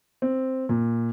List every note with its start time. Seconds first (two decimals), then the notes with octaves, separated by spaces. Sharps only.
0.22 C4
0.69 A#2